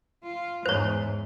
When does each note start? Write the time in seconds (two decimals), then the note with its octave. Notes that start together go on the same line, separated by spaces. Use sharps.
0.23 F4
0.66 E2 G#2 C5 C#5